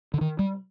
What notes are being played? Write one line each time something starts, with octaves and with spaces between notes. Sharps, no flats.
D3
D#3
G3